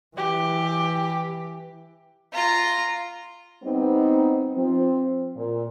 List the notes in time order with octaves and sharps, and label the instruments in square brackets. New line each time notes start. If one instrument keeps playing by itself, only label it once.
[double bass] E3 [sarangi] G4
[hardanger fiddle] F4 A#5
[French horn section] G3 B3 C4 D#4
F3 C4
A#2